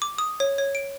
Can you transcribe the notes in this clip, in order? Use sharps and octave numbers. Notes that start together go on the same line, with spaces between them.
D6
D#6
C#5
C#5
D7